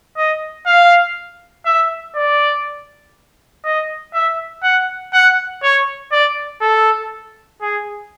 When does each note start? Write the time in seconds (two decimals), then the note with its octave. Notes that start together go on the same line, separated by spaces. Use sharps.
0.17 D#5
0.66 F5
1.65 E5
2.16 D5
3.64 D#5
4.13 E5
4.63 F#5
5.13 F#5
5.63 C#5
6.12 D5
6.61 A4
7.61 G#4